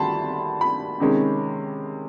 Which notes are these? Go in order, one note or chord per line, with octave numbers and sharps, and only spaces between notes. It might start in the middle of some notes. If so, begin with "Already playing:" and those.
Already playing: D2 D#3 G3 A5 B5 C6
B5
C3 D#3 G#3 C#4